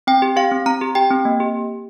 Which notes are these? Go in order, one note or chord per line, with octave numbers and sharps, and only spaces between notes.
C4 G5
G4
G4 F5
C4
C4 A#5
G4
G4 G5
C4
A#3
G4